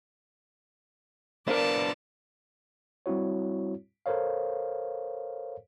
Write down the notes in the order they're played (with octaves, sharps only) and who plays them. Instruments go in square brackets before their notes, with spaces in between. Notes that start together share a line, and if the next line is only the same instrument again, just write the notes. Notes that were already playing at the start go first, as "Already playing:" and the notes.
[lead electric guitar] B3 D4 [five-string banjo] A#4 C5 F5 [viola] D5 A5
[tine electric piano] G3 C4 E4 F#4 C#5
A4 A#4 C5 C#5 F5